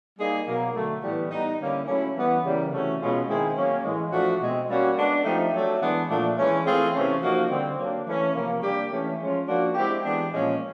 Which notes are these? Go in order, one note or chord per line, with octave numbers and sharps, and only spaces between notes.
G3 A#3 D#4 G#4
B2 F#3 A#3
D3 F#3 A3
A2 E3 G3 B3
G3 B3 D#4
D3 G3 A#3 C#4 E4
F#3 A3 C#4 E4
E3 G3 B3
C#3 E3 G3 A#3
C3 E3 A3 C#4 F#4
B2 G#3 C#4 F4 G#4
D#3 G#3 C4 E4 G#4
F#3 A#3 C#4
A2 E3 G#3
F3 A3 D4 F#4
B2 G#3 C4
G3 A#3 C#4 F#4
G#3 B3 D4
F3 A3 C4 D#4 G4
F#3 A3 D4
E3 G#3 B3 D4
A#2 F3 A3 D4
E3 G#3 C#4
E3 A3 C4 F4 G#4
C3 E3 A3 C#4
F3 A#3 D#4 F#4
D3 G3 C4
F#3 A#3 D4
E3 A3 C#4
C3 F3 A#3
G3 A#3 D4 G4
E3 A3 C#4
F3 G#3 C#4 F4
F3 A#3 D4 F#4
G#3 C4 E4 G4
E3 G#3 B3 D4 G4
A#2 F3 G#3 C#4